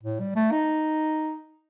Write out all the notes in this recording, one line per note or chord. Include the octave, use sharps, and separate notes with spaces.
A2
G3
A3
D#4